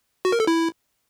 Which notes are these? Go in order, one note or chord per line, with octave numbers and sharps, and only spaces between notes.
F#4
A#4
A4
E4